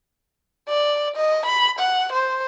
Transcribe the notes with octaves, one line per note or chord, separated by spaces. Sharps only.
D5
D#5
B5
F#5
C5